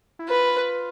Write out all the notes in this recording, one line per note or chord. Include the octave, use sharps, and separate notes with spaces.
E4
F4 B4